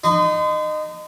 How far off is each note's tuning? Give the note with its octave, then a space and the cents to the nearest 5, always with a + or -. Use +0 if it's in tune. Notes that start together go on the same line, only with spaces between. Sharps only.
D#4 -20 C6 -40